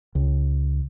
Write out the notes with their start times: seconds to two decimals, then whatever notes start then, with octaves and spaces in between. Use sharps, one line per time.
0.15 C#2